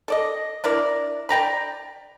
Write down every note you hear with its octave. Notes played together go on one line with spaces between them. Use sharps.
A4 D5 D#5
D4 E4 A#4 D5
D5 G5 A#5 B5